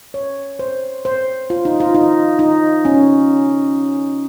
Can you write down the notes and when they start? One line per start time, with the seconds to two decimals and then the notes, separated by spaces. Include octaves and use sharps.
0.14 C#5
0.59 C5
1.05 C5
1.50 F4
1.65 D#4
1.80 F4
1.95 D#4
2.39 D#4
2.85 C#4